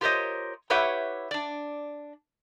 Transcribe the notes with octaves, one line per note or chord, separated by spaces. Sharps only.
F4 G4 A#4 C5 C#5 D#5
E4 G4 B4 C#5 E5 F#5
D4 D5